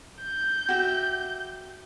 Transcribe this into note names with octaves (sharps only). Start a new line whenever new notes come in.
G6
F#4 G4 E5